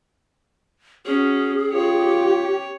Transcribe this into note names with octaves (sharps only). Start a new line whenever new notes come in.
C#4 F#4 G#4
F4 G4 C#5